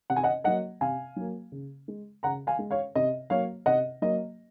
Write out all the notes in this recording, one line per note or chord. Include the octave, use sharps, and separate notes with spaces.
C3 F#5
G#5
D#5 F#5
F#3 A#3 D#5 F#5
C3 F5 G#5
F#3 A#3
C#3
G#3
C#3 F#5 A#5
F5 G#5
G#3
C#5 F5
C3 D#5
F#3 A#3 C#5 F5
C3 D#5 F#5
F#3 A#3 D#5